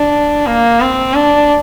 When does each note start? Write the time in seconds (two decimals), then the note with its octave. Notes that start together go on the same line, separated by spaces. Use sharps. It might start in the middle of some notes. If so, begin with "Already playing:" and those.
Already playing: D4
0.46 A#3
0.81 C4
1.15 D4